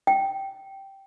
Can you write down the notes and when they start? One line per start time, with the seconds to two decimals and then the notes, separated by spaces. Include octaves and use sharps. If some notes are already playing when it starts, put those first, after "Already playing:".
0.07 G5